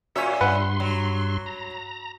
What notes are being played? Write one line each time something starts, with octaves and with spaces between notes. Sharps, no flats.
A#2 C#4 F#4 C#5 E5
G2 B4 F#5 C6
F#3
A#5